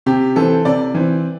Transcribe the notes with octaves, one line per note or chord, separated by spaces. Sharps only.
C3 G4
E3 C4 A4
C3 D5
E3 C4